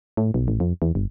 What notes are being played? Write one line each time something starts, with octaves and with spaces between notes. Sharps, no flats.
A2
B1
A1
F2
E2
G1